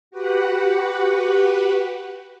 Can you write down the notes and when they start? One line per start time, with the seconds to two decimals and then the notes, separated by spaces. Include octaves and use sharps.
0.11 F#4 G4 B4 F#5